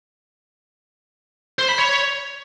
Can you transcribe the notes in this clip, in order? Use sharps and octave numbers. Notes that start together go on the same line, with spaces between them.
C5
B5
C#5